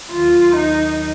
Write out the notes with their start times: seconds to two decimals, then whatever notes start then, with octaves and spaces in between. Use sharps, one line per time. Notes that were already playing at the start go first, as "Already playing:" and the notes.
0.11 D#2 D#3 F#3 F4
0.54 D#4